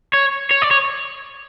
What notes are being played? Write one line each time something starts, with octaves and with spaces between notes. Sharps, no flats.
C#5
C#5
D5
C#5